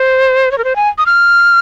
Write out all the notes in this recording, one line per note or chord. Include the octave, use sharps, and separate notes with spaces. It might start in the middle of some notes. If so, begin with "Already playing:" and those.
Already playing: C5
C#5
A#4
C5
G#5
D#6
F6